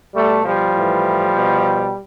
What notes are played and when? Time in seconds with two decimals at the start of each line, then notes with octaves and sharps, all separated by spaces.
0.15 B2 G3 A3
0.44 F3 G3
0.74 A2 E3
1.33 B2